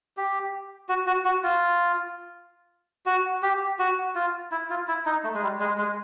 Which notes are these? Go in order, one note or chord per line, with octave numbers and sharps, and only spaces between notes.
G4
F#4
F#4
F#4
F4
F#4
G4
F#4
F4
E4
F4
E4
D#4
A3
G#3
G3
G#3
G#3